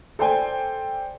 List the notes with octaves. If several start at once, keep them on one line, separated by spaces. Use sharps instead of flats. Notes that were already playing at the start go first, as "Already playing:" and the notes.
A4 C5 D5 G5 G#5